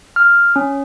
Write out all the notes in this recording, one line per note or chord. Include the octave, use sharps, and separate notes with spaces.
F6
C#4